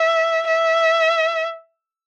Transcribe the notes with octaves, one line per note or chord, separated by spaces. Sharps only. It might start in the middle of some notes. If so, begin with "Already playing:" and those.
Already playing: E5
E5